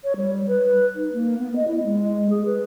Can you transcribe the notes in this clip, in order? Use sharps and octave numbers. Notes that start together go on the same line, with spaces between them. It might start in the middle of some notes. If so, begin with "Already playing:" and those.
C#5
G3
B4
D#4
A#3
B3
D#5
E4
G#3
G#4
B4